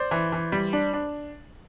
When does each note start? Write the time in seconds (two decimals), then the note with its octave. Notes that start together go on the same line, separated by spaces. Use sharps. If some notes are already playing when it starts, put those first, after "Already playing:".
Already playing: C5 D5
0.11 E3
0.32 E3
0.52 G3
0.73 D4
0.93 D4